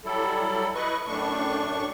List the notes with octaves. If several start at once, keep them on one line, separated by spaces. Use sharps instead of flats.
F#3 G3 E4 A4
E4 B4 D#5 C#6
F#2 A2 A3 D4 C#6